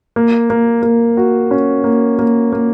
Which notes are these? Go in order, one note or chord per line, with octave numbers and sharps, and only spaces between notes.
A#3
A#3
A#3
F#4
C#4
A#3
A#3
A#3